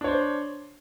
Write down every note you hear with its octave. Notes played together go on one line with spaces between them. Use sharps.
D4 C5 C#5